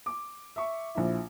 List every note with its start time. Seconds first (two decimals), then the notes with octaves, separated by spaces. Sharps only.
0.06 D6
0.56 E5 C#6
0.95 A#1 E4